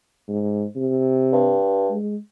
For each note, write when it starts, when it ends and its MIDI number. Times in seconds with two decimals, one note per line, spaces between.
0.28 0.65 44
0.76 1.58 48
1.33 1.92 43
1.90 2.17 56